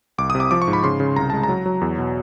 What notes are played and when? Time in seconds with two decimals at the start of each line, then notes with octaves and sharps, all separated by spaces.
0.18 C2 D6
0.30 D#6
0.35 C3
0.40 D6
0.51 F3 D6
0.62 C#6
0.68 G#2
0.73 B5
0.84 C#3 C6
1.00 C#3
1.16 C2 A#5
1.30 G#3 A5
1.43 A#5
1.49 F#3
1.66 F#3
1.81 E2
1.98 B2